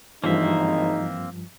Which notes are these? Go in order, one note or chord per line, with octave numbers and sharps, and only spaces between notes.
G#1 G2 E3 F3 A#3 C4 D#4 E5